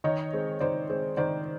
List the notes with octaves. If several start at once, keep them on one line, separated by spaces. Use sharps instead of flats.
D#3 C#5 D#5
G#3 C4
D#3 C5 D5
G#3 C4
D#3 C5 D5